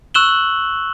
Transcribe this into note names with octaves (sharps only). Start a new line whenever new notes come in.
C#6 E6 F#6 E7 F#7 G7